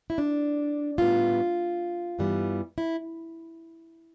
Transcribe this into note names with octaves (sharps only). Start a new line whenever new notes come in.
E4
D4
A2 G3 B3 F4
G2 E3 G3 B3
E4